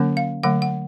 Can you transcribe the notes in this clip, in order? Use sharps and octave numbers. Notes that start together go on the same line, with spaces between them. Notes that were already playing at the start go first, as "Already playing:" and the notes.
Already playing: D3 F#3 A#3 C#4
F5
D3 F#3 A3 F#5
F#5